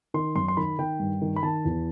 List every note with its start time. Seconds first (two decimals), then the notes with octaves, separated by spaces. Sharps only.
0.14 D#3 C6
0.36 F#2 C6
0.48 C6
0.57 D#3 B5
0.79 D#3 G5
0.99 G2
1.21 D#3
1.36 B5
1.43 D#3 A5
1.65 E2